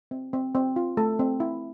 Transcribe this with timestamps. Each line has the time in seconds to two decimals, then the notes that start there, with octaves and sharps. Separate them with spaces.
0.11 C4
0.33 C4
0.55 C4
0.76 F4
0.97 A3 A4
1.19 C4
1.40 E4